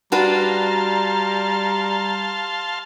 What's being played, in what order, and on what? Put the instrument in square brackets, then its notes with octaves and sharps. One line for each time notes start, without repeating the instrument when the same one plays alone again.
[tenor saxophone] G3 [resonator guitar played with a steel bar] D4 F#4 B4 [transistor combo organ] F5 A5 C6 [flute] A#5